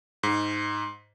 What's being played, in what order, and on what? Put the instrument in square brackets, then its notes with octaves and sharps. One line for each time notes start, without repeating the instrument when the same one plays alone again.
[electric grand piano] G#2